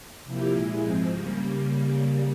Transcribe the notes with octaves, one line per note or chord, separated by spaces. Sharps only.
C3 F3 A#3 E4 G4
A#2 G#3 E4 G#4
G#2 F3 G#3 C4
C#3 G3 A#3